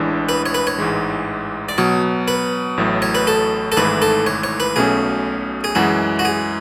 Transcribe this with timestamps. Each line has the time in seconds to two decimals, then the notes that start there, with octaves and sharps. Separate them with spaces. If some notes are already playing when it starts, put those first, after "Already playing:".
Already playing: A1 A2 E3 G#3 D4
0.29 B4
0.46 C#5
0.55 B4
0.67 C#5
0.78 A1 G#2 E3 G#3
1.69 D5
1.78 B2 F#3 B3 C#5
2.28 B4
2.77 A1 A2 F#3 A3
3.02 C#5
3.15 B4
3.27 A4
3.72 A4
3.77 G#1 G#2 E3 A3 E4 B4
4.02 A4
4.27 C#5
4.44 C#5
4.60 B4
4.76 B1 B2 A3 C#4 G#4
5.64 G#4
5.75 F#2 E3 G#3 F#4
6.19 F#4
6.25 G#4